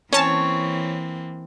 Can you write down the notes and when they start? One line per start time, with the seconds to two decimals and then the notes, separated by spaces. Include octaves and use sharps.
0.13 E3 A#3 C4 C#4 C#5 A5